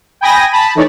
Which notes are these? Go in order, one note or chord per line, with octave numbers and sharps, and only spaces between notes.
G5 G#5 B5 D#6 A#6
A5 B5
E3 A3 D#4 C#5 D5